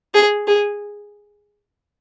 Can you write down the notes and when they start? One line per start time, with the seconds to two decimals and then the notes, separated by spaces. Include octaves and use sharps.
0.14 G#4
0.47 G#4